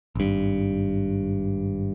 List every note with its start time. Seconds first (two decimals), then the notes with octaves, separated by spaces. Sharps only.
0.15 G#1 G2